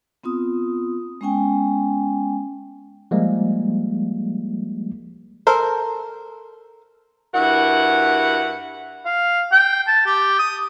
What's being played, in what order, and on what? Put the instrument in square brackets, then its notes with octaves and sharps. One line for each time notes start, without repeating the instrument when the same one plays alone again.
[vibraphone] B3 C4 F4 D#6
G#3 B3 C#4 G5 G#5
[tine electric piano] F3 G3 G#3 A#3
[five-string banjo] A4 A#4 C5
[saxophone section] G2 E4 F#4 A#4 F#5
[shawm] F5
G5
A5
G4
D#6